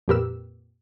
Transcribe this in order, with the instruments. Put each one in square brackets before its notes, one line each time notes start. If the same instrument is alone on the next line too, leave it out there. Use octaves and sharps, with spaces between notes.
[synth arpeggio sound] F2 A#2 G4 A#4 B4 E6